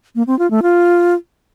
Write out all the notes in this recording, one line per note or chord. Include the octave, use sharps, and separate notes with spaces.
A#3
C4
F4
A3
F4